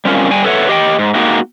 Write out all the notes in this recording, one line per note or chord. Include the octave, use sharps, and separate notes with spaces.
G3 C4 C#4 F4 A#4
G3 G5 G#5
A4 B4 C#5 E5 F#5
G4 D#5 F5 G5
G#2
G#3 A#3 D#4 F#4 G4